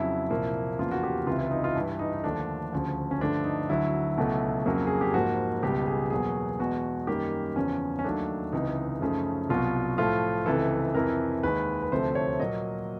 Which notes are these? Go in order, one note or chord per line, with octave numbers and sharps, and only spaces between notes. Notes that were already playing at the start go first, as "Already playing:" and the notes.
Already playing: F2 C#3 F#3 E4
C2 A#2 F3 A#3
E2 C#3 F3 A#3 F4
F#4
G4
C#2 C3 E3 F4
E4
D#4
F4
G2 E3 G3 E4
D#4
D#4
D#2 D3 F3 A3 D4
D2 C#3 F3
C#4
G2 D3 F3 A3 D4
D#4
D2 D3 F#3 E4
C#2 B2 F#3 A3
F2 C#3 F#3 A#3
G#4
G4
G#2 F3 A#3 F#4
C#2 B2 G3 G4
G#4
E2 B2 F#3 A#3 G#4
E2 B2 G#3 F#4
F#2 D#3 G3 A#3 G4
E2 C#3 F3 C#4
C#4
D#2 D#3 F#3 A3 D4
C#2 C3 E3 D#4
F#2 C#3 F3 A3
C2 B2 F#3 F4
A2 F3 A3 F4
C#2 C3 E3 A4
F2 C3 E3 A#4
D#2 D#3 G#3 B4
B4
D2 C3 F3 A3 C5
C#5
A#2 F#3 A#3 D#5